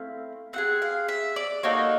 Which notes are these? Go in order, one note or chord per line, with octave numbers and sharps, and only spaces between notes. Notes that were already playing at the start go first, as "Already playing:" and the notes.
Already playing: A3 C4 E4 F5
C4 F4 G#4 F#5
F5
E5
D5
A#3 D#4 F#4 A4 C#5